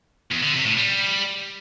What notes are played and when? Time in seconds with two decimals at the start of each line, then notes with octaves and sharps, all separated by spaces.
0.32 E2
0.43 D3
0.55 C3
0.66 A2
0.78 G3